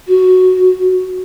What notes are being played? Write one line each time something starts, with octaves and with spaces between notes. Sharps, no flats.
F#4